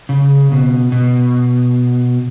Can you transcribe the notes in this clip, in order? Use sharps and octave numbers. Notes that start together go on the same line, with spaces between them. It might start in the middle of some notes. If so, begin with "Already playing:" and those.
C#3
B2
B2